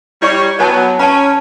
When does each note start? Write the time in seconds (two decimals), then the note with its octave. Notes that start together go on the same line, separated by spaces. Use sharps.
0.22 G3 E4 C#5 D5 C#6
0.59 F#3 B3 C#5 G#5 A5
1.00 C#4 A5 A#5